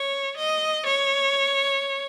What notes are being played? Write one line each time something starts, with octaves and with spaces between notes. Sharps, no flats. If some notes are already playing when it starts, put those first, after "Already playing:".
Already playing: C#5
D#5
C#5